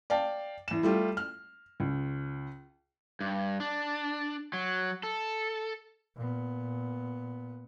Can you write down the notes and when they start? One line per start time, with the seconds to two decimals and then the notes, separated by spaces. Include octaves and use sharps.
0.10 D5 F5 G5 A5
0.68 E2 E7
0.83 G3 A3 F4 G4
1.17 F6
1.80 C#2
3.21 G2
3.60 D4
4.53 F#3
5.03 A4
6.15 A#2 B3